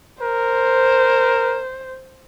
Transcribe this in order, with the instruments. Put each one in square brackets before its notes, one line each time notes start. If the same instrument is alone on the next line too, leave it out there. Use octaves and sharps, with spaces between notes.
[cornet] A#4 [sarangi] C5